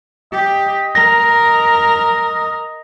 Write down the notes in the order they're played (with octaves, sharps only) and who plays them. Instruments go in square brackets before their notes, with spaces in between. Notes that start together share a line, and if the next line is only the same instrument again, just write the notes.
[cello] G4 [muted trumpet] D#5
[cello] A#4 [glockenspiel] A#6